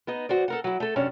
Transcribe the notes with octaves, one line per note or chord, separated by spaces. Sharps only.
B3 D#4 D#5
F#4 C5 D5
A4 A#4 F#5
F#3 E4
A3 A4
F#2 C3 C#4 D4